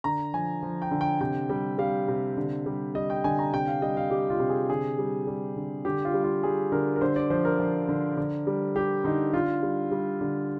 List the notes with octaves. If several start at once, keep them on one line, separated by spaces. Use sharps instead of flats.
D3 A#5
F3 G#5
F3
G5
D3
G5
C3 G5
G3
G3 F5
C3
D3
G3
G3 D#5
G5
D3 G#5
A#5
C3 G5
F5
G3 D#5
F5
G3 G4
F4
C3
G#4
D3 G#4
G3
G3
D3
D3 G4
F4
G3
F4
G3 G#4
D3 A#4
A#4
D3 C5
D5
F3 C5
A#4
F3
D3
D3
G3
G3 G4
D3 D#4
D3 F4
G3
G3
D3